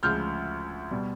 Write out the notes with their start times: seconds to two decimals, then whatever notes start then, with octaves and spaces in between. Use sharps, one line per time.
0.03 D2 C#3 F3 G#3 F6 G6
0.91 B2 G3